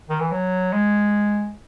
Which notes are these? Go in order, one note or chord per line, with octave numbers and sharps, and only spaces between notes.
D#3
E3
F#3
G#3